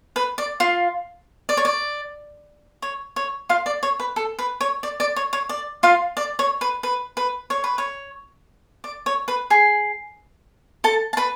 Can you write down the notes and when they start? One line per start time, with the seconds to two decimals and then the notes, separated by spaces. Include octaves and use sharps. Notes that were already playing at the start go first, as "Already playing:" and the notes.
0.16 B4
0.38 D5
0.60 F4 F5
1.49 D5
1.57 C#5
1.65 D5
2.82 C#5
3.16 C#5
3.49 F4 F5
3.66 D5
3.83 C#5
4.00 B4
4.16 A4
4.39 B4
4.61 C#5
4.83 D5
5.00 D5
5.16 C#5
5.33 C#5
5.49 D5
5.83 F4 F5
6.17 D5
6.39 C#5
6.61 B4
6.83 B4
7.17 B4
7.50 C#5
7.64 B4
7.78 C#5
8.84 D5
9.06 C#5
9.28 B4
9.50 G#4 G#5
10.84 A4 A5
11.13 A5
11.17 B4 B5